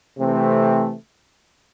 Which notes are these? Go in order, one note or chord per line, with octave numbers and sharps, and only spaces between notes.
C3 E3 A3 C4